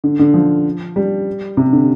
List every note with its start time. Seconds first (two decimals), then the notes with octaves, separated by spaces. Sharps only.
0.04 D3
0.19 D3
0.34 F3
0.96 G3
1.57 C3
1.73 D3